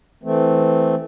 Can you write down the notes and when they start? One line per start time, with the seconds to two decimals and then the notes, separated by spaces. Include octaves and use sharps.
0.23 E3 A3 C4